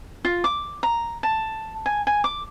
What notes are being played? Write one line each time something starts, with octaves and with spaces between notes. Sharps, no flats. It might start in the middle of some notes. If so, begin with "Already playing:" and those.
F4
D6
A#5
A5
G#5
G#5
D6